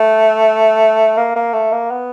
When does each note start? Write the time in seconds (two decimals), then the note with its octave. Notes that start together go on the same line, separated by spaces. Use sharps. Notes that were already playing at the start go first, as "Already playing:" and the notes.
Already playing: A3
1.17 A#3
1.36 A#3
1.53 A3
1.72 A#3
1.91 B3